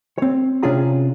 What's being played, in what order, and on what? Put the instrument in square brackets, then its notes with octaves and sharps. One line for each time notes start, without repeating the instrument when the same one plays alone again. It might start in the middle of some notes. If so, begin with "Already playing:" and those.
[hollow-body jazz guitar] C4 C#5
C3 C#4 D4 F4 G#4 A#5